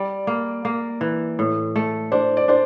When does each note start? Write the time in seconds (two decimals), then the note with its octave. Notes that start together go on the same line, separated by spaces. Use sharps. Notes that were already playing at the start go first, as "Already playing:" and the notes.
Already playing: G3 D5
0.27 A#3
0.65 A#3
1.01 E3
1.39 A2
1.76 A3
2.12 D4 C5
2.37 D5
2.48 D4 C5